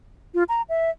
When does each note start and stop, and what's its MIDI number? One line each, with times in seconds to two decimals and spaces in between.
0.34 0.43 65
0.49 0.62 82
0.69 0.90 76